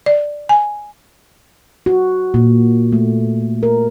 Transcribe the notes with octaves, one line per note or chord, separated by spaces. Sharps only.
D5
G#5
F#4
A#2
A3
A#4